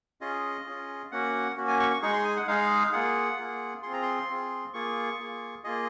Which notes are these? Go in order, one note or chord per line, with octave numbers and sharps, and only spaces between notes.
C#4 F4 G#4 D#5
C#4 F4 G#4
A#3 C#4 F#4 F#5
A#3 C#4 F#4
G#5
C#6
C#6
G#3 D#4 G#4 C#6
C6
G#5
F#5
G#3 D#4 G#4 F5
A#3 F4 G#4 F#5
A#3 F4 G#4
C4 F4 G#4 C6
A#5
C6
C4 F4 G#4
A#3 F4 G#4 C#6
A#3 F4 G#4
A#3 F4 G#4 D#5